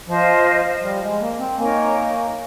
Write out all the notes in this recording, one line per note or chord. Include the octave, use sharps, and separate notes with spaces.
F3 F4 C5 D#5
G3
G#3
A#3
C4
A#3 D#4 A#4 C#5 G#5